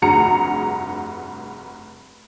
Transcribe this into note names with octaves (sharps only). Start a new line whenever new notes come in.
F1 G2 F#4 G#4 A#5 C#7